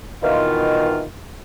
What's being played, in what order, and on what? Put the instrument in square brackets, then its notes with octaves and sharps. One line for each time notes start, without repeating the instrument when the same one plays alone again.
[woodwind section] B2 D#3 E3 F4